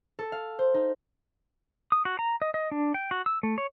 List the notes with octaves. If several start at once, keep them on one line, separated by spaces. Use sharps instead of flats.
A4
F5
C5
D#4
D#6
F#4
A#5
D#5
D#5
D4
G5
F#4
E6
A3
C#5